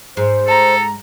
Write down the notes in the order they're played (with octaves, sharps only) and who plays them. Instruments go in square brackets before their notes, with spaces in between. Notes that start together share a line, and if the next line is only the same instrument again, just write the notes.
[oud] G#2 [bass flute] C5
[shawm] A4 [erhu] A#5